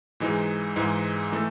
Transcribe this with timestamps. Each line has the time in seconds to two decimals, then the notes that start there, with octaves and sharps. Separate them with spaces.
0.20 G#2 E3 G#3 D#4
0.76 G#2 E3 G#3 D#4
1.32 E3 A3 D#4 A4